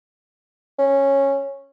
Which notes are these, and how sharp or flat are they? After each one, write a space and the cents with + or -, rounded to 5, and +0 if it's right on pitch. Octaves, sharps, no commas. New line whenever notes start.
C#4 -10